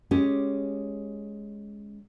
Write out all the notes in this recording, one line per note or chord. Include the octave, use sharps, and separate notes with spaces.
G#3 C#4 G4